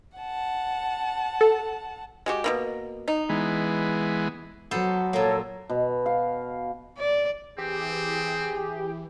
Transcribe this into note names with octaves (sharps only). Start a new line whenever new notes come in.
F#5 A5
A4
G#3 F#4 G4
B2 D#3 A#3
D#4
E3 G#3 B3
F#3 B3 A4 C5
A#2 A#3 A4 C#5
B2
F5
D5
E3 C4 G4 G#4